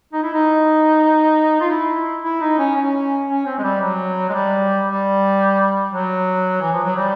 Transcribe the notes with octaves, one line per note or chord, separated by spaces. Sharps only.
D#4
E4
D#4
F4
E4
E4
D#4
C#4
C#4
C#4
C4
G#3
G3
F#3
G#3
G3
G3
F#3
E3
F3
F#3
G3